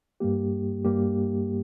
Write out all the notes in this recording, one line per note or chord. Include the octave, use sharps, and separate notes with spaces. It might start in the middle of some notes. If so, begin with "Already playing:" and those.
G2 G3 A#3 G4
G2 G3 A#3 G4